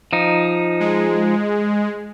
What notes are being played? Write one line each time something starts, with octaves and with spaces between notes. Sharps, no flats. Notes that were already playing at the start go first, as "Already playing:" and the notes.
F3 D#4
G#3